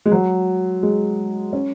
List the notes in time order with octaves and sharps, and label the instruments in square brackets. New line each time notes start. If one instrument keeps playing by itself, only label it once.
[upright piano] G#3
F#3
G#3
C#4